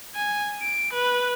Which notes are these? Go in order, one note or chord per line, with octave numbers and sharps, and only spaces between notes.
G#5
D7
B4